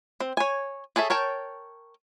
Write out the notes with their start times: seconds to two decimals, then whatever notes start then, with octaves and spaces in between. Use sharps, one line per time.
0.20 C4
0.37 C#5 G#5
0.96 G#4 A4 C#5 E5
1.10 A#4 C#5 G5 A5